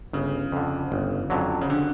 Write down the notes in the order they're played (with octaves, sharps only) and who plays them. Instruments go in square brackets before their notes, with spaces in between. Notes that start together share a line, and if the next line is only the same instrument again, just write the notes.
[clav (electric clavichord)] G1 [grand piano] C#3
[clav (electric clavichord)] F2 D3
G1
F2 D3 F#3
[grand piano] C#3
D3